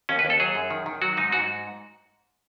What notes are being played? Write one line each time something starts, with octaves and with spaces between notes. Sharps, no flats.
D#2 C#4
B4
D#2
A4
F#3 G#4
F#2
D#3
D#3
F#3 F#4
G#2 D#4
G#2 F#4